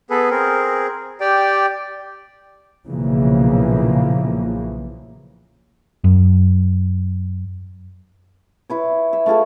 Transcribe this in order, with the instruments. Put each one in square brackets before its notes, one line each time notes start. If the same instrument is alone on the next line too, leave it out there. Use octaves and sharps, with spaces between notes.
[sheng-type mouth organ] B3 G#4 A4 B4
C4 G#4 A#4
G4 D5 G5
[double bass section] B1 A#2 C#3 E3 F3 A#3
[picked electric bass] F#2
[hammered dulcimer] E4 B4 C#5
E5
A3 F4 G#4 A4